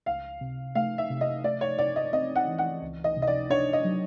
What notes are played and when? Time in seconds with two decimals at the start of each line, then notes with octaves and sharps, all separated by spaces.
0.06 C#2 F5
0.41 C3
0.75 A3 F5
0.98 E5
1.10 C3
1.21 D#5
1.44 A3 D5
1.61 C#5
1.79 C3 D5
1.96 D#5
2.13 C4 D#5
2.36 F#5
2.47 E3
2.58 F#5
2.82 C#2
3.04 D#5
3.17 C3
3.22 D#5
3.27 D5
3.50 D4 C#5
3.73 D#5
3.85 F#3